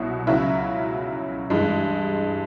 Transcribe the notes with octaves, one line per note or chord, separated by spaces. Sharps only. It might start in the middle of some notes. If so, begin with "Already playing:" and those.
Already playing: C2 B2 F#3 E4
C#2 C#3 F#3 E4 E5
G2 E3 G#3